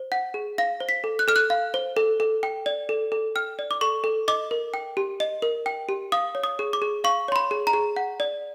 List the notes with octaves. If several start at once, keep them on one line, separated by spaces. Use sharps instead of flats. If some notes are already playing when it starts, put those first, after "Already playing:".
Already playing: C5
F#5
G#4
F5 A#6
C5
B6
A4
F#6
A4 F6
F#6
F5
C5
A4
A4
G5
D5
A4
A4
G5 F6
D5
D6
A4 C#6
A4
D#5 D6
A#4
G5
G4
D#5
A#4
G5
G4
F5 D#6
C#5
D#6
G#4
D6
G#4
F5 C#6
C#5 C6
B5
G#4
A#5
G#4
F#5
D5